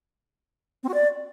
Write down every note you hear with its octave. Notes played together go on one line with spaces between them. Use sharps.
C4
F#4
D5